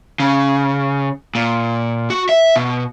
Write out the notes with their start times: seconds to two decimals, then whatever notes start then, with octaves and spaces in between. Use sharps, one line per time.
0.20 C#3
1.35 A#2
2.10 F#4
2.29 E5
2.56 B2